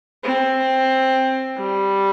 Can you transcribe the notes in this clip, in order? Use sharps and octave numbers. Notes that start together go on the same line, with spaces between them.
C4
G3